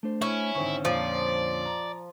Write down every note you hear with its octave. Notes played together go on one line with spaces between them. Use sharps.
A3 D4 C5
C#4 E4
G#1 D3 C4 C#6
F2 A#2 F3 C#4 D5
A#5